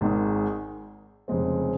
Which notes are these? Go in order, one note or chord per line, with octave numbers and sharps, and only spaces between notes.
G#1 G#2 D#3 G#3
F1 F2 C#3 G#3 C4